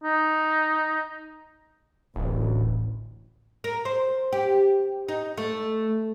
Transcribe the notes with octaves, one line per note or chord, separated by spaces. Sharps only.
D#4
D1 A1
A#4
C5
G4
D#4
A3